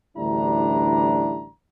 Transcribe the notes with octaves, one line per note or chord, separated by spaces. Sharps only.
A1 D2 G3 D4 E4 A#5